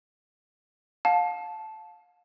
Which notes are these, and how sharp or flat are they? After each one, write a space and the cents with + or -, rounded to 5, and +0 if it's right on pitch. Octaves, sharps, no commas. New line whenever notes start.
F5 +35 A5 -10